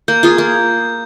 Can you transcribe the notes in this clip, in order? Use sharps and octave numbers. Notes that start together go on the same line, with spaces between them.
A#3 G6
F4 G#4
A#3